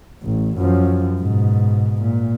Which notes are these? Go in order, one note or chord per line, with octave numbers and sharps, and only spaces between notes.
A1
F#2 F3
G#2 B2
A#2